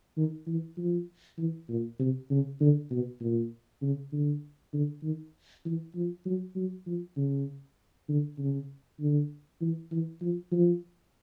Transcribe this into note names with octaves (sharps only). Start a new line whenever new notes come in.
D#3
E3
F3
E3
A#2
C3
C#3
D3
B2
A#2
C#3
D3
D3
D#3
E3
F3
F#3
F#3
F3
C#3
D3
C#3
D3
E3
E3
F3
F3